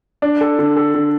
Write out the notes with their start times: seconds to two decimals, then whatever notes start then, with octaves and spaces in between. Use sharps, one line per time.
0.22 D4
0.41 A4
0.59 D3
0.76 A4
0.94 D3